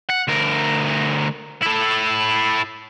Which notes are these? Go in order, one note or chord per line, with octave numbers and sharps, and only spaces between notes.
F#5
D2 A#4
E4 A4